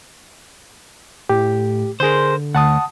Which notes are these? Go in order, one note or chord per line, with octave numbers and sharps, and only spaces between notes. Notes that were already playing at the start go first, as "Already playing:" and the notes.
A2 G4
D3 G#4 A#4 C5 C6 G6
D2 F#5 A5 D#6